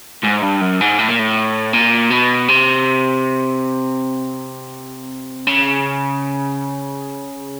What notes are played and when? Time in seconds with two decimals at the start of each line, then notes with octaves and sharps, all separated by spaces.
0.24 G#2
0.43 G2
0.62 F#2
0.81 G#2
0.99 A2
1.09 A#2
1.19 A2
1.73 A#2
2.10 B2
2.48 C3
5.47 C#3